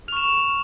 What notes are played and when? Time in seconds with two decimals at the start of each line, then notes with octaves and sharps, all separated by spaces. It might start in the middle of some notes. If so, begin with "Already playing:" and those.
0.08 F6 F7
0.12 C#6 E7
0.25 F7